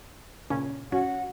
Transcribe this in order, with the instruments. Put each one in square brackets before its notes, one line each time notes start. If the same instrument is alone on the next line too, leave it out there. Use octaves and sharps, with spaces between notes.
[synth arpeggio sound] A#2 C#3 C#4
[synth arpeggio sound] C#4 [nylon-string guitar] F#4 [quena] F#5